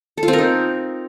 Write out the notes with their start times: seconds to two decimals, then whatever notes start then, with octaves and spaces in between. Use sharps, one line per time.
0.17 A4
0.23 F4
0.28 C4
0.33 A#4
0.38 D#4